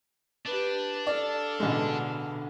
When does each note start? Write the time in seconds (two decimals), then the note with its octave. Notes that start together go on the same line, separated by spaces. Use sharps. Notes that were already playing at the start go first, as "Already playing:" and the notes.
0.46 D4 G4 B4
1.07 A4 D5 F5
1.60 A1 B2 D3 G#3